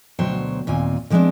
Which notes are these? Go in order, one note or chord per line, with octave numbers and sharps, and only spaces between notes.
D2 B2 F#3 C5 C#5 G5
D#2 A#2 C4 G#5
D3 F3 G#3 B3 C4 D4